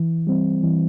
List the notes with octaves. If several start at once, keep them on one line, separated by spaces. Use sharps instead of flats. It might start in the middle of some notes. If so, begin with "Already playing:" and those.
Already playing: E3
G3 C4
E3